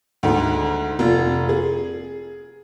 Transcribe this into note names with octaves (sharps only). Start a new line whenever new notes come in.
D2 G#2
F1 F4
G#4